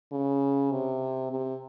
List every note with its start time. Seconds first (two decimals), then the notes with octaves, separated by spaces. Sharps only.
0.12 C#3
0.72 C3
1.32 C3